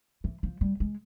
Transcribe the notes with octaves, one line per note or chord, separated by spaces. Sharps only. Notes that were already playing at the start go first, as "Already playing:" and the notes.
E3
F3
G3
G#3